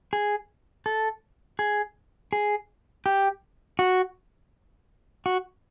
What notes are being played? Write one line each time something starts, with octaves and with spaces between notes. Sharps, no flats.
G#4
A4
G#4
G#4
G4
F#4
F#4